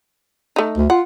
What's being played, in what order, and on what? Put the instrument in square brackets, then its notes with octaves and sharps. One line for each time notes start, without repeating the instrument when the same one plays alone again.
[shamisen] A3 D#4
[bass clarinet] D2
[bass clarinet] F4 [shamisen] F#5